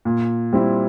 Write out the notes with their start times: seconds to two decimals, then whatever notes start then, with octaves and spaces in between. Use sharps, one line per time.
0.05 A#2
0.53 G3 C4 E4